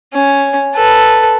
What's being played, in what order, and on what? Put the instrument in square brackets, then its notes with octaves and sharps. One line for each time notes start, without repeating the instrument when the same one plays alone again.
[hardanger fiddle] C#4
A4 B4